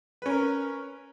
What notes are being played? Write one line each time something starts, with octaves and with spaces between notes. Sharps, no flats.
C#4 A#4 B4